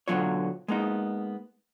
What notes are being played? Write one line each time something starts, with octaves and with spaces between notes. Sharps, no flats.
B1 D3 F#3 F4 C#5
G#3 A#3 B3 D#4